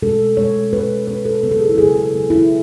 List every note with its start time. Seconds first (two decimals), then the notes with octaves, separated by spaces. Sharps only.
0.02 B2 G#3 C#4 A4
0.37 B2 G#3 C#4 C#5
0.72 B2 G#3 C#4 B4
1.08 B2 G#3 C#4 B4
1.25 A4
1.43 C#3 F#3 B3 B4
1.51 A4
1.60 G#4
1.69 E4
1.78 C#3 F#3 B3 G#4
1.96 A4
2.13 C#3 F#3 B3
2.30 E4